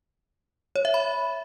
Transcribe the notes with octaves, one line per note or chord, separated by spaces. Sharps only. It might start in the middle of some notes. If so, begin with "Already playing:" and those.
C#5
E5
B5